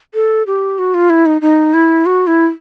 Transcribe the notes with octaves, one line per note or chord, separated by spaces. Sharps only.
A4
G4
F#4
F4
E4
D#4
D#4
E4
F#4
E4